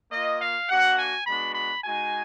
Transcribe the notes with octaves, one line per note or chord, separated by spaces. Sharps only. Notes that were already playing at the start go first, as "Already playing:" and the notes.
A#3 F4 D#5
F5
A#3 D4 F#4 F#5
G#5
G#3 B3 D4 F#4 B5
B5
G#3 D#4 F#4 G#5